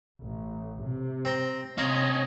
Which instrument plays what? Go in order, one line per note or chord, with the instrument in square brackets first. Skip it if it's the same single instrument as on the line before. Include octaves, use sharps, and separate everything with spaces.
[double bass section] A1
C3
[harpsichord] C4 A#5 C6
[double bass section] C3 [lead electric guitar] C4 C#4 [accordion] C#5 D#5 [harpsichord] F5 A#5 C6